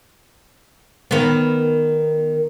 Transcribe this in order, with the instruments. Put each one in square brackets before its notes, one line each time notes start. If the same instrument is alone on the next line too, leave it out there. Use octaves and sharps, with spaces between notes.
[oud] D#3 B3